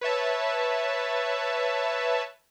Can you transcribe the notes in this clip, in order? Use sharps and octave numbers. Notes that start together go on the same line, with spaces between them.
B4 C#5 E5 A5